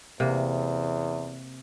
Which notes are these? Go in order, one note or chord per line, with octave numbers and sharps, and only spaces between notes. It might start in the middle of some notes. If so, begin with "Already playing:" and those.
E2 C3 A#3